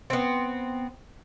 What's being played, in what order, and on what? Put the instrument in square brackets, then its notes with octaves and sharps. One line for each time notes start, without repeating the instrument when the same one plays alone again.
[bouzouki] B3 C4